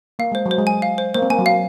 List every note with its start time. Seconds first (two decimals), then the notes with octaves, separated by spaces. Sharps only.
0.19 A#3 F5
0.32 G#3 C5
0.46 F#3
0.51 C5
0.58 G#3
0.67 G#5
0.82 F5
0.98 C5
1.14 A#3 C5
1.22 C4
1.30 A#3 G#5
1.39 F#3
1.46 F5